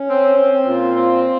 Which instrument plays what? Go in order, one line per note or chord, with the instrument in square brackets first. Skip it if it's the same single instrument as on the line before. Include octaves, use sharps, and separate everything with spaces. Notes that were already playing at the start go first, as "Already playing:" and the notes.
Already playing: [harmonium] C#4
[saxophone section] C4
C4
[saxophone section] A#2 [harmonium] F4
[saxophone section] C4